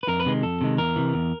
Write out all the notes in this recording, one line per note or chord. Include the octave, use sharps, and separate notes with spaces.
B4
F2 A#4
B4
C3 D#3 G#3
F2 A4
C3 D#3 G#3
E2 A#4
C3 E3
E2